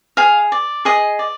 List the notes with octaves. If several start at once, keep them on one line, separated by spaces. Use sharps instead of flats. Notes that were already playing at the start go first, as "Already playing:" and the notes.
G#4 F5
D5
G#4 D#5
D5